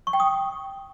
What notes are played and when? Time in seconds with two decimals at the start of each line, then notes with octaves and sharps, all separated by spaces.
0.07 C#6
0.13 G5
0.20 D#6